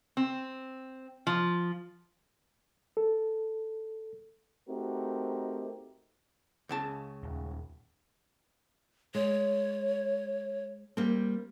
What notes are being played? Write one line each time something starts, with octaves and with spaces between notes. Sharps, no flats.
C4
F3
A4
A3 C4 D#4 F#4 G4 A#4
C#2 C#3 A5
D#1
G#3 C#5
G3 A#3 C4